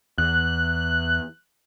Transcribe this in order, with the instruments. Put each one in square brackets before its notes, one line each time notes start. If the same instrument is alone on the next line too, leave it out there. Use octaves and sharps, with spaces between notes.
[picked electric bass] E2 [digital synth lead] F#6